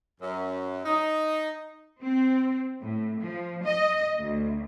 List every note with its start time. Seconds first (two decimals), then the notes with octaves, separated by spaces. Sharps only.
0.21 F#2
0.85 D#4
2.02 C4
2.83 A2
3.21 F3
3.65 D#5
4.20 D2